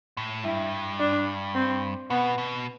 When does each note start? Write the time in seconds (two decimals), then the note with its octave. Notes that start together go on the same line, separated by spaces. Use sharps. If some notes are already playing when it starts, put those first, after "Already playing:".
0.17 A2
0.44 G2 E4
1.00 D4
1.55 C4
2.10 B2 B3
2.38 B2